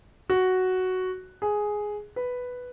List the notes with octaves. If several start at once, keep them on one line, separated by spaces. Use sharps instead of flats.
F#4
G#4
B4